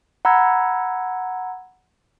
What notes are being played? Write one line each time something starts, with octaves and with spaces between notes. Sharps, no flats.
F#5 A#5 B5 E6 G#6